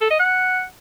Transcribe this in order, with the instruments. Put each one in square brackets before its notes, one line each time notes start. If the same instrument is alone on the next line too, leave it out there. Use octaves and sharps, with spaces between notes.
[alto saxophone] A4
D#5
F#5